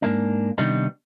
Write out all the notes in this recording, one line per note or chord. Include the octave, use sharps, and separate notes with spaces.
G#2 A#3 D4
C3 D#3 G3 B3 D4 D#4